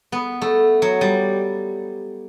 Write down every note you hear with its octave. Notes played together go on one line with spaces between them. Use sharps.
B3
A3
F#3
G3